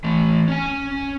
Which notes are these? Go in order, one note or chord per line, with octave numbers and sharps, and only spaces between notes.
E3 A3
C#4 G#5